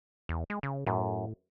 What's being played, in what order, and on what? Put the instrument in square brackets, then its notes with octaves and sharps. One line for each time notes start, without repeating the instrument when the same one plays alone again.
[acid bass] E2
G#3
C#3
[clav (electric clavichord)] F#2 [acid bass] A2